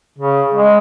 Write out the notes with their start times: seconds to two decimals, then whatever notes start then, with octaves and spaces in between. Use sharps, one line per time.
0.18 C#3
0.54 G#3